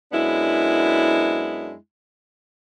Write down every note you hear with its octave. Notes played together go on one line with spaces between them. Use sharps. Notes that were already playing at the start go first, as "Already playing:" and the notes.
F#2 G#3 B3 D4 E4